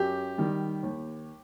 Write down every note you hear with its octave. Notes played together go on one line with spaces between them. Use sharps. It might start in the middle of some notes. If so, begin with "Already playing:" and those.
Already playing: F#2 G4
D#3 G3
D#2